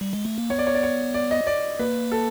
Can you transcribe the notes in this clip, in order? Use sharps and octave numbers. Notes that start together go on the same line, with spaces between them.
G3
G#3
A3
A#3
B3 C#5
D5
C#5
D5
C#5
D5
D#5
D5
A#3 B4
A4